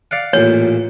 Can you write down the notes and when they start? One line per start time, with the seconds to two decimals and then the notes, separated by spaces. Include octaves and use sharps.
0.11 D5 F5 F#5
0.33 A1 A#2 C#5